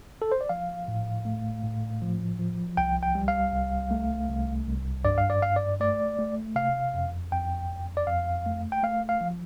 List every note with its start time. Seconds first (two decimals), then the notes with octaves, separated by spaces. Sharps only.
0.22 A4
0.32 C5
0.41 D5
0.49 F3 F5
0.88 A2
1.25 A3
1.63 A2
2.02 F3
2.39 F3
2.77 C2 G5
3.03 G5
3.15 G3
3.28 F5
3.53 C2
3.91 A3
4.29 C2
4.67 C2
5.05 G2 D5
5.18 F5
5.30 D5
5.42 G2 F5
5.56 D5
5.80 A3 D5
6.19 A3
6.55 C3 F5
6.94 F2
7.32 F2 G5
7.70 F2
7.97 D5
8.07 F2 F5
8.46 A3
8.72 G5
8.83 A3 F5
9.09 F5
9.21 F3